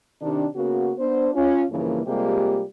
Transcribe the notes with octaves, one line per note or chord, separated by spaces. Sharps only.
C3 D#3 D4
C#3 A#3 B3 F#4
B3 D4 C5
C#4 F4
G2 C#3 E3 F3 A#3
C3 G3 G#3 A#3 F4 G4